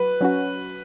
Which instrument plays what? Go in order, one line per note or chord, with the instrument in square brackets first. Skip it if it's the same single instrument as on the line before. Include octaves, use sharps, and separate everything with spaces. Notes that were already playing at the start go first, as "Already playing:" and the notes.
Already playing: [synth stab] F#3 F#4 [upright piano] B4
[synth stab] F#3 C#4 F#4